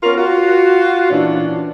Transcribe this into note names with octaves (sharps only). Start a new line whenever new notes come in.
B3 C#4 F4 A#4
F4 F#4
A#2 E3 C#4 D4